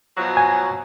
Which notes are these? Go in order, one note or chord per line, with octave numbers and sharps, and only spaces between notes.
B2 F3 F#3
G#5